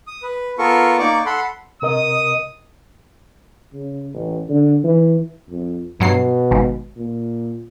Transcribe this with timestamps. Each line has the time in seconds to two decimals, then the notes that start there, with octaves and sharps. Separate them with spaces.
0.07 D#6
0.22 B4
0.58 B3 F4 A4 A#4 C#6
0.99 A#3 D#4 D5 C#6 D6
1.26 A4 F#5 B5 C6
1.82 C3 A#4 D#5 D#6
3.74 C#3
4.14 A1
4.49 D3
4.84 E3
5.49 F2
6.00 G2 B2 F#3 C7
6.51 G#1 G#2
6.96 A#2